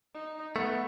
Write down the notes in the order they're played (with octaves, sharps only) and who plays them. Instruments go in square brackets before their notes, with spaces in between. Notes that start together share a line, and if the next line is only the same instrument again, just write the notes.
[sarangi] D#4
[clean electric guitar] A3 [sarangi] B3